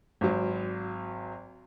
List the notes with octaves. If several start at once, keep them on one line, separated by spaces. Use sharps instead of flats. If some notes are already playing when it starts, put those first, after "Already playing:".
G#1 F#3